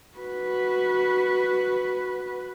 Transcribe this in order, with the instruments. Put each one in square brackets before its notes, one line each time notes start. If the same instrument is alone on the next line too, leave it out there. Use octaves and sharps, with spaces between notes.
[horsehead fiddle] F#4 B4